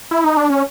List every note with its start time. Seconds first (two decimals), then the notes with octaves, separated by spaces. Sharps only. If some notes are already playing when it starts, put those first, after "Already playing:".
0.11 E4
0.24 D#4
0.37 D4
0.50 C#4